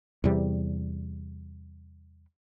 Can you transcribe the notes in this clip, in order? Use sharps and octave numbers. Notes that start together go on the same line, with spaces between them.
E2 C3 G3